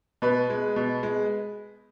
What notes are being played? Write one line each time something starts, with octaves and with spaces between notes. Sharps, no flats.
B2 B4
G#3
B2
G#3